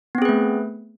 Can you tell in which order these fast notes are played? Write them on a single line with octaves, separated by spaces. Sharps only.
B3 C4 G#4 B4 A3